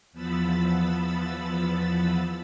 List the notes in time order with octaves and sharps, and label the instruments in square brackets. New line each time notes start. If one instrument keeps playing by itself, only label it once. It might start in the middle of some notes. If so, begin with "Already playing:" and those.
[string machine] E2 F3 B3 B5 E6 A6